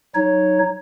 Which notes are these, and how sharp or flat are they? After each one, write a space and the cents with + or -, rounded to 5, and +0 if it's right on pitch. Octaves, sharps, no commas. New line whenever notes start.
F#3 +0 D#4 +0 C#5 +0